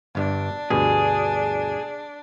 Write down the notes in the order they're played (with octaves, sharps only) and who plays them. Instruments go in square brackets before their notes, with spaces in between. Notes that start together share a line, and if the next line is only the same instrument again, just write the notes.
[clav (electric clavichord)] G1 G2 [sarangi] D4
[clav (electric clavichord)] D2 G2 B2 [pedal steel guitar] G#4